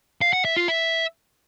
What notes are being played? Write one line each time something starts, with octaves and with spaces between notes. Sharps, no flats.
F5
F#5
E5
F4
E5